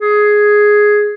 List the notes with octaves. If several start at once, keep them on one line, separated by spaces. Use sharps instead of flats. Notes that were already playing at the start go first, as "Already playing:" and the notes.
G#4